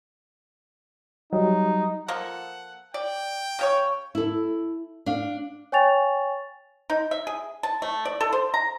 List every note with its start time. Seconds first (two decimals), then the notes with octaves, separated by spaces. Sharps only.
1.33 F#3 G3 D#4
2.08 F3 A#3 A4 F#5
2.94 D5 G5
3.59 C#3 C#5 C#6
4.15 E4 A4
5.06 D4 F5
5.72 C#5 G5 G#5 C#6 A6 F7
6.90 D#4
7.11 E5
7.27 G#4
7.63 A5
7.82 A3
8.05 D5
8.21 A4
8.33 C5
8.54 A#5